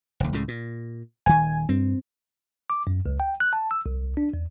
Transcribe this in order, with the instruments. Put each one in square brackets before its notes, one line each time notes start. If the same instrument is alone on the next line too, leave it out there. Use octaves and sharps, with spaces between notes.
[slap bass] F1 D#2
C#2 A2 C#3
A#2
[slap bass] D#1 D#3 [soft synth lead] G#5
[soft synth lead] G2 [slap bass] C4
[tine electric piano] D6
F#2
C#2
G5
F#6
A5
E6
C2
D4
E2